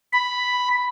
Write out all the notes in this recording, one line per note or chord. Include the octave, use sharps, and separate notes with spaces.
B5